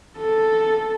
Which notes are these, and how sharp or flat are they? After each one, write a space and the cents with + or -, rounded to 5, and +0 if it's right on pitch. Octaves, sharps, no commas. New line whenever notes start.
A4 +0